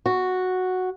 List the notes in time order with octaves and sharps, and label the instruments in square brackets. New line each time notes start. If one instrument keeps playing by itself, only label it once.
[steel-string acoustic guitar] F#4